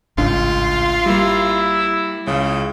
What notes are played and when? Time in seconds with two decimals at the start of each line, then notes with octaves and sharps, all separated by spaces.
0.17 G#1 C#2 A2 D4 F4
1.06 G3 A#3 E4
2.27 C#2 C#3